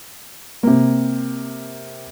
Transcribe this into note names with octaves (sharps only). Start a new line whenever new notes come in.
C3 A#3